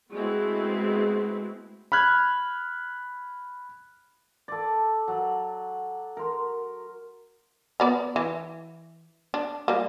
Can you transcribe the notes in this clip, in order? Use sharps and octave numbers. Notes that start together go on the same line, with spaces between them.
G#3 A3 B3 C4 E4 F#4
B5 F6 F#6 G#6
A4 D5
F#3
A#4 C6
B3 D5 A#5
E3
D4
G3 A#3